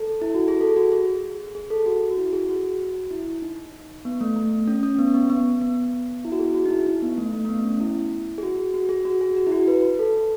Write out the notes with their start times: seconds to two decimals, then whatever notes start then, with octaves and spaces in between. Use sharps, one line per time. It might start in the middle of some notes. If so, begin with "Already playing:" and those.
Already playing: A4
0.22 E4
0.35 F#4
0.48 G#4
0.61 A4
0.76 F#4
0.92 G#4
1.55 G#4
1.70 A4
1.86 F#4
2.11 F#4
2.17 E4
2.33 G#4
2.49 F#4
3.11 E4
3.42 D#4
4.05 B3
4.21 A3
4.36 A3
4.67 C#4
4.83 C#4
4.94 C#4
4.99 B3
5.14 B3
5.30 B3
5.61 B3
6.25 E4
6.32 F#4
6.39 G#4
6.55 F#4
6.66 D#4
6.70 E4
6.86 D#4
7.02 B3
7.18 A3
7.33 A3
7.45 A3
7.49 B3
7.64 C#4
7.80 E4
8.38 G#4
8.43 F#4
8.74 F#4
8.89 G#4
9.05 F#4
9.21 G#4
9.36 F#4
9.47 E4
9.52 F#4
9.68 B4
9.99 A4